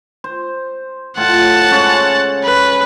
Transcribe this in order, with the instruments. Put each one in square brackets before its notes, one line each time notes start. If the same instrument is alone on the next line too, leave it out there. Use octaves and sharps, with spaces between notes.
[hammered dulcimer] C5
[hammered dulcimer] A2 F4 [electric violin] F#5 A5
[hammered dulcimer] C#3 G#3 C#4
[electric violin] B4